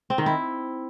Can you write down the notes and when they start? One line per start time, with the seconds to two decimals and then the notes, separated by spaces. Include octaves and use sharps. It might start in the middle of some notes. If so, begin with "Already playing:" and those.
0.10 C4
0.18 D#3
0.26 E4